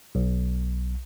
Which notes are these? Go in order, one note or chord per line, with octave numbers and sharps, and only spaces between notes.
B1